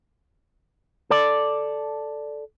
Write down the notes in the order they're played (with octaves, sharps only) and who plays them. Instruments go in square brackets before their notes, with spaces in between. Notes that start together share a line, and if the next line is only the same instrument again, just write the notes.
[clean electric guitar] A4 D5